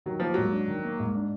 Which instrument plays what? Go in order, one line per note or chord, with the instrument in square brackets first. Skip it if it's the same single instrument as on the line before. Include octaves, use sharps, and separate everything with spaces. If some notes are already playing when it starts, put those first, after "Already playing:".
[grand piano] D#3 [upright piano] F#3
[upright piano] F3 [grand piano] A#3
[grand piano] G#2 [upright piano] F#3
[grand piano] D4
D#3
A#3
G#2
D4